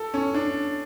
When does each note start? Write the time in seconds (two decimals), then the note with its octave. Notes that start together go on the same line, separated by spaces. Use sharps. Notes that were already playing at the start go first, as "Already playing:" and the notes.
Already playing: A4
0.14 C#4
0.34 D4